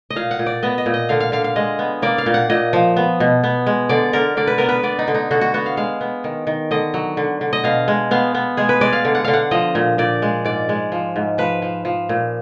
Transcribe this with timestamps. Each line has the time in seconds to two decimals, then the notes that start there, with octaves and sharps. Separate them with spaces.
0.10 D#5
0.16 A#2 F5
0.31 F#5
0.39 A#2
0.46 D5
0.63 B3 D#5
0.78 D#5
0.86 A#2
0.94 D#5
1.09 D3 F5
1.20 F5
1.32 D3 F5
1.44 F5
1.56 G#3 D#5
1.79 B3
2.02 A#3 D5
2.18 F5
2.26 A#2
2.34 F#5
2.50 A#2 D#5
2.73 F3
2.96 B3
3.20 B2
3.44 B3
3.66 G#3
3.89 D3 D5
4.13 D3 A#4
4.37 D3 D5
4.47 B4
4.58 B3 A#4
4.69 B4
4.83 B3 D5
4.99 D#4
5.08 D3
5.14 D#4
5.31 D3 F#4
5.41 F#4
5.54 B3 F#4
5.66 F5
5.77 G#3 F5
6.01 B3
6.24 D#3
6.47 D#3
6.71 D3 D#5
6.94 F#3
7.17 D3
7.41 D3
7.53 D#5
7.64 B2 F5
7.88 G#3
8.11 B3 F5
8.35 B3
8.57 G#3 G#4
8.69 B4
8.81 G#3 D5
8.93 F5
9.05 D3
9.15 F#5
9.24 D3 F5
9.34 F#5
9.51 F3 D#5
9.75 A#2
9.98 A#2 D5
10.22 G#3
10.45 G#2 D5
10.69 G#3
10.92 F3
11.16 G#2
11.38 F3 B4
11.62 F3
11.85 F3
12.09 A#2